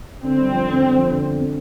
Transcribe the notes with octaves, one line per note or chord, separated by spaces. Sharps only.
D3 C4
G3
F2
D3
D3
F2
D3
D3
C4